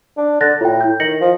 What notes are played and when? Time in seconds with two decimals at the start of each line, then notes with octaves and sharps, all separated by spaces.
0.17 D4
0.41 D3 F#6 A6 A#6
0.61 A2 F4 G5
0.81 E4 G6
1.00 D#3 A#6 C#7 F#7
1.21 F3